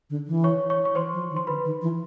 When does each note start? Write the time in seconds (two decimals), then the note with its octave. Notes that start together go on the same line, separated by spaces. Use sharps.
0.10 D3
0.27 E3
0.44 C#5 C#6
0.70 C#5 C#6
0.85 C#6
0.95 E3 C5 C6
1.13 F3
1.30 D#3
1.37 C6
1.47 D3 B4 B5
1.65 D#3
1.82 E3